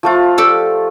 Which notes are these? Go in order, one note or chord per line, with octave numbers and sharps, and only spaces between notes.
F3 A3 F4
G4 A4 D5